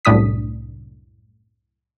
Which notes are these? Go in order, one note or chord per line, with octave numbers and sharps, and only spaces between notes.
C2 F#2 A2 D4 D#6 B6